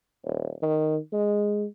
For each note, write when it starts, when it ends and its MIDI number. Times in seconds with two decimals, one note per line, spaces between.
0.25 0.52 27
0.62 0.97 51
1.13 1.65 56